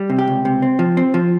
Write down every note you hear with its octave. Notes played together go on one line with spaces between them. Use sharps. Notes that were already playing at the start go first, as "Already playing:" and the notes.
Already playing: G3
C3
G4
C#2
C3
C4
F3
C4
F3